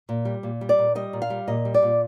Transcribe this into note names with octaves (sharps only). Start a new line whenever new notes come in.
A#2
G3
A#2
G3
D5
A#2
G3 D#5
A#2
F5
G3
A#2 D#5
G3
D5
A#2